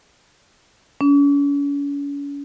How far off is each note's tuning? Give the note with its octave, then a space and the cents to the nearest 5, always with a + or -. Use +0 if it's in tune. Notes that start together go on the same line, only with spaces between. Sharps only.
C#4 +40